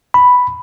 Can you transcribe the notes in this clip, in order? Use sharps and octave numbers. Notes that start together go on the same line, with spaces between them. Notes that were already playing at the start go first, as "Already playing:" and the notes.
B5